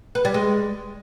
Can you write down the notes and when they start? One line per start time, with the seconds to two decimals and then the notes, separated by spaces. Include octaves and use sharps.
0.15 B4
0.25 G3
0.34 G#3